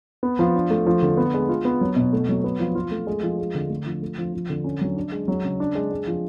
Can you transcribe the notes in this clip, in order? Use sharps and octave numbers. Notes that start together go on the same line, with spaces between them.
B3
F3
D4
A3
F3
D3
B3
G#3
F4
B3
F#3
B2
A3
F#3
B3
F3
F4
A3
G#3
F3
G#3
D3
A3
F3
A3
F3
F3
D3
C#4
F#3
D4
G#3
F#3
C#3
D4
G#3
G#3
F3